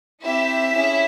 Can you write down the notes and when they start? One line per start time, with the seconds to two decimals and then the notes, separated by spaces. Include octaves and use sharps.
0.23 C4 E4 G4 E5
0.72 C#4 E4 G#4